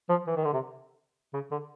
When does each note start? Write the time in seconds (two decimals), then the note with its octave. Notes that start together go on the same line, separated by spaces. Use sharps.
0.09 F3
0.27 E3
0.36 D#3
0.44 D3
0.53 C3
1.34 C#3
1.51 D3